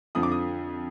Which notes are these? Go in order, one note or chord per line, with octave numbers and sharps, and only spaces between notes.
F2 D3 F3 D#6
D6
D#6